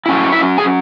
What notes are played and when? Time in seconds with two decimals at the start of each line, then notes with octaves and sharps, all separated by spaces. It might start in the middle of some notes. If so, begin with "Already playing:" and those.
0.06 F#3 C#4 E4
0.32 E4 E5
0.58 G#4 G#5